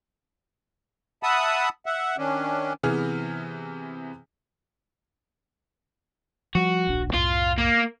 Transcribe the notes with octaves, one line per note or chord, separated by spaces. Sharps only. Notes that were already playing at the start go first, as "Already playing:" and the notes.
E5 F#5 A5 B5 D#6
E5 F#5
D#3 C#4 D4
C3 E3 B3 G#4 F6
F3 G3 F#4
D1 A#1 D4
C2 F#2 A2 F4
A#3